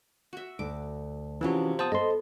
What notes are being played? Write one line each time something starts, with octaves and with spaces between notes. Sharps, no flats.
F#4 E5
D2 D6
C3 E3 F3 C#4 E4 F#4
B3 C5 A5 D#6
A4 C5 D#5 C6